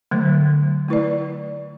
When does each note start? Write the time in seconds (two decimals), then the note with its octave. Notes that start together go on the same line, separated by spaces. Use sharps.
0.11 D3 F#3 A3
0.88 A3 E4 B4 D5